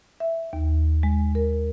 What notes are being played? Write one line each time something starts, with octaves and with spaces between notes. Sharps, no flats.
E5
D#2
G#3
A#4